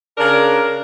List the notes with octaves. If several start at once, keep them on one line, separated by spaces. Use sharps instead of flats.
C#3 D4 A#4